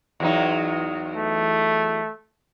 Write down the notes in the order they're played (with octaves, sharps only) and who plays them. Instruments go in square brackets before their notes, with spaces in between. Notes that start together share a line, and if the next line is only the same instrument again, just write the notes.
[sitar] E2 F#3 D#4
[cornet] A3